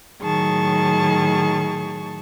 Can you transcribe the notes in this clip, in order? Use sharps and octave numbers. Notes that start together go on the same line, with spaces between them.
A2 D#3 F#3 G#4 A5 C#6